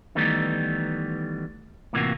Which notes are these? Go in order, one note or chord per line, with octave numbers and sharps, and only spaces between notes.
D#3 E3 G3 A3 B3 D#4
A2 C3 E3 A#3 F4 F#4